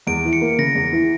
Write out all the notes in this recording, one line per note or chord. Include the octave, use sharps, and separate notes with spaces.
E2 D7
E3
C#7
A#3
C#3 A#6
E2
E3